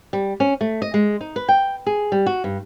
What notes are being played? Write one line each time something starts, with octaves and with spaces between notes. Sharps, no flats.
G3
C#4
A3
D#5
G#3
D#4
B4
G5
G#4
G3
F#4
G2